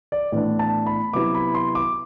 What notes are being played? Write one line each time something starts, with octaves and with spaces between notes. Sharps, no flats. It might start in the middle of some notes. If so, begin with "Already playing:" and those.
D5
A2 E3 B3 D4 D5
A5
B5
C3 F#3 B3 E4 D6
B5
C6
D6